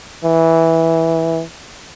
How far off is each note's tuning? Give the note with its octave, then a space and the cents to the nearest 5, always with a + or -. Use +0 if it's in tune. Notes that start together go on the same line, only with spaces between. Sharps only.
E3 -10